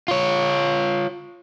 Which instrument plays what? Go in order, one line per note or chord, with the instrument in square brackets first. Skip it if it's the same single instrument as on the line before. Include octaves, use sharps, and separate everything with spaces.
[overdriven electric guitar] F4 C#5